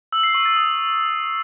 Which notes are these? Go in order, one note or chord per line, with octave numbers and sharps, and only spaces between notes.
E6
C7
C#6
A6
D#6